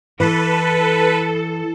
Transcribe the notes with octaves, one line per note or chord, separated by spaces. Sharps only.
E3 A4 B4